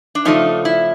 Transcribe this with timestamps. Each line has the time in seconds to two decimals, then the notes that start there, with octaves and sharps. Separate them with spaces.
0.15 D4
0.25 C#3 F3 A3 D4 D#4
0.65 E4